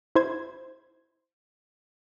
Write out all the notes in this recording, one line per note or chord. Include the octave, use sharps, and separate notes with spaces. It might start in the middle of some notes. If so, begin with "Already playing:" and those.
E4 C5 G#6